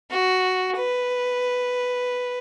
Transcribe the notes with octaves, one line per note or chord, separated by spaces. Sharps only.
F#4
B4